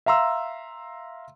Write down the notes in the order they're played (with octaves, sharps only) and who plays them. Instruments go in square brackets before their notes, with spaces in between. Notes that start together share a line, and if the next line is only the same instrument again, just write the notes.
[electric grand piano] E5 F5 A#5 C6 E6